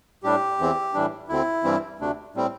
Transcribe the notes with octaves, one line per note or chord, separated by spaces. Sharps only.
A2 G3 D4 G4
E2 E3 C4
A2 E3 G3 D4
D2 D3 C4 E4
G2 E3 G3 C4
D2 C3 A3 D4
A2 G3 C4